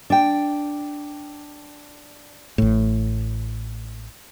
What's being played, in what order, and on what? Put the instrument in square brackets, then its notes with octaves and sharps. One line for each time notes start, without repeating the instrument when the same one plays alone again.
[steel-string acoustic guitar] D4 G5
[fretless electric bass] A1 A2